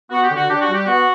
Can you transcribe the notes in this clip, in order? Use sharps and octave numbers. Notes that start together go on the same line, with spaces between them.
B3 F#4
G4
D3
F#4
D4 G4
F#4
G3
G4
B3 F#4